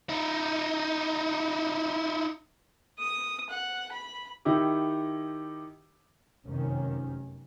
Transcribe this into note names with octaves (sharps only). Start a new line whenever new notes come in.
D#4 E4
D#6
F#5
B5
D#3 D#4 E4 G4
F1 F#2 C3 D#3 C#4